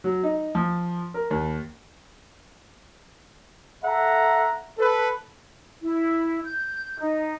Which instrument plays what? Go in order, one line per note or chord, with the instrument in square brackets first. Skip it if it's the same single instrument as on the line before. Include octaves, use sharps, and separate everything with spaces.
[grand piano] F#3
D#4
F3
A#4
D#2
[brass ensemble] A4 E5 F#5 A#5
A4 B4
[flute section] E4
G6
D#4